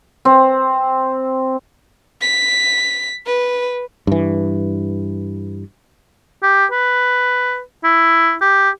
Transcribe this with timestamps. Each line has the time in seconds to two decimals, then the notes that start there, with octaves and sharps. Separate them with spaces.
0.25 C4
2.21 B6
3.26 B4
4.07 G2 E3
6.43 G4
6.72 B4
7.84 E4
8.41 G4